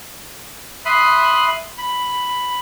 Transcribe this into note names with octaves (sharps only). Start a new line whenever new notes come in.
E5 B5 C6 D#6 F#6
B5